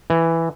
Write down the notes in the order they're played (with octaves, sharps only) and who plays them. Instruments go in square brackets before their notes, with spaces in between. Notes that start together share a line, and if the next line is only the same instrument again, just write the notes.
[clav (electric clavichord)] E3